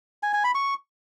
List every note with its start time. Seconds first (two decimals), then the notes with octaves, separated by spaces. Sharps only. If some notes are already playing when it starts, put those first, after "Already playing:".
0.23 G#5
0.34 G#5
0.44 B5
0.55 C#6